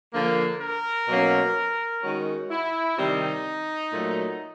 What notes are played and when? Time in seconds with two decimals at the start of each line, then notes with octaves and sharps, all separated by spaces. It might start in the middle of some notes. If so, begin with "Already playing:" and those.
0.13 D3 F3 A#3
0.61 A#4
1.08 B2 F#3 A#3 C#4
2.03 D#3 G#3 C#4 F#4
2.50 E4
2.97 C3 D#3 G3 C4 D#4
3.92 A#2 F#3 A3